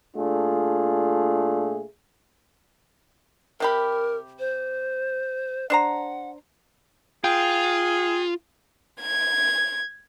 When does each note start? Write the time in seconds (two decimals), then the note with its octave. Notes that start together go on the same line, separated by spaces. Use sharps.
0.16 A#2 A3 D4 F4 G#4
3.60 C3 G4 A#4 B5
4.39 C5
5.70 D4 C5 F#5 A#5
7.24 F4 G#4 G5
9.01 G#6